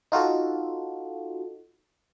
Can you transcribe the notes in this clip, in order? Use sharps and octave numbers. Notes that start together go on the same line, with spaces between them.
D#4 F4 F#4 A4